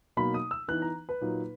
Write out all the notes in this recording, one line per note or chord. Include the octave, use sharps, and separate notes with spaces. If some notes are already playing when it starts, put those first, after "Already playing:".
B2 F#3 A#3 D#4 B5
D#6
E6
E3 B3 D#4 F#6
A#5
B4
A#2 F#3 A#3 D#4